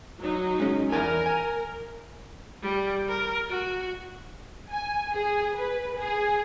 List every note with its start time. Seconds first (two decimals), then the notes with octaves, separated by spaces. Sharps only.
0.18 F#3 D#4
0.60 G#3 C#4 D#5
0.92 E2 A#4 D5 G#5
1.26 G#5
2.62 G3
3.08 A#4
3.50 F#4
4.70 G#5
5.13 G#4
5.56 B4
5.98 G#4